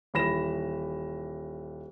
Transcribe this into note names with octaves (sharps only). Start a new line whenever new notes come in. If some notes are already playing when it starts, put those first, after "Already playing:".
D#1 E3 B5 A#6 E7